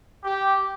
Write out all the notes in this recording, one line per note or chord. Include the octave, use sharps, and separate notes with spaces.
G4